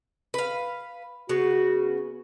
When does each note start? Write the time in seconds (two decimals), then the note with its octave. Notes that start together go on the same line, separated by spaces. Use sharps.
0.34 B4 F5
1.29 C#3 B3 F#4